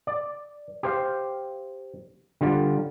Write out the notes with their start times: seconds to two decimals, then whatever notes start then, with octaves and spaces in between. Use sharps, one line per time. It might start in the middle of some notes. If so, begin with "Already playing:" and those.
0.07 D5
0.83 G4 C5 F5
2.41 D3 G3 F4